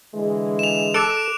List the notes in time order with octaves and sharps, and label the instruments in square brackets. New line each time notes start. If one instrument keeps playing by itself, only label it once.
[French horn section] D3 E3 G#3
[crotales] E7 F7
[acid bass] A4 [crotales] D6 F#6 D7